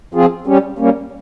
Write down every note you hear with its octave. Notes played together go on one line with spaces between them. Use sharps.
F3 C4 F4 G#4
G3 C#4 G4
G3 A#3 C#4